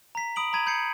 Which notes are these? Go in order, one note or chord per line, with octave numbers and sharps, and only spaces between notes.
A#5 B6
B5 D#6 D7 F#7
A#5 B5 G#6 D#7
B5 G6 G#6 C7 C#7